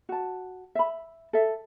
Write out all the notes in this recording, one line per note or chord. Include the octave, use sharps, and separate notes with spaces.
F#4 A5
E5 B5
A4 E5